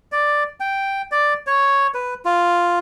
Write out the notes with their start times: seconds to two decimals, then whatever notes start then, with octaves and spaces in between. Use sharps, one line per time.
0.12 D5
0.60 G5
1.12 D5
1.47 C#5
1.94 B4
2.25 F4